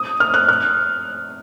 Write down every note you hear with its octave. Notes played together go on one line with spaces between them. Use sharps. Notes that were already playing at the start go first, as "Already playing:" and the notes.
Already playing: D#6
F6
F#6
F6